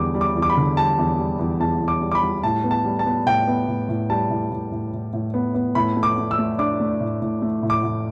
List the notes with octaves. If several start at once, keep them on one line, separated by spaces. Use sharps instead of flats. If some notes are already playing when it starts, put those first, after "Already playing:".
Already playing: E2 D3 G3 D6
G3
D6
E2
D6
B5
D3
G3 A5
E2
G3
E2
E2 A5
E2
D6
G3
D6
B5
G3
A2 A5
B3
A5
G3
A5
B3
A2 G5
B3
A2
A2
G3 A5
A2
A2
A2
A2
A2
B3
B3
A2 B5
A3
D6
A3
E6
A3
D4 D6
A3
A2
A2
A3
A2
D6
A2